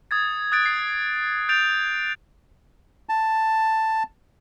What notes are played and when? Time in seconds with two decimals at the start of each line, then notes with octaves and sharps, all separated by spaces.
0.11 D#6 G#6 A6
0.52 D#6 F#6 A6 D7
0.66 C7
1.49 G6 A6 D7 F7
3.09 A5